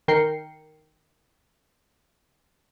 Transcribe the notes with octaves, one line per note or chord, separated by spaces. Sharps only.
D#3 A#4 G5 C7 C#7